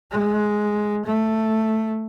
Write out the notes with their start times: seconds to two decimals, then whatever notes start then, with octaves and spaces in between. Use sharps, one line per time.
0.11 G#3
1.05 A3